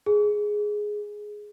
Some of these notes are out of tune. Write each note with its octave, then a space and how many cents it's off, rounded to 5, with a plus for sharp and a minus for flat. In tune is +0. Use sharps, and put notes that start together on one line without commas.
G#4 +5